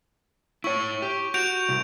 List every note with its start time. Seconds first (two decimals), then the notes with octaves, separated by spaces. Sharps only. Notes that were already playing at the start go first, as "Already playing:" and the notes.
0.64 E4 C#5 C#6
1.02 G4
1.34 F#4 G6 D7 F7
1.69 C2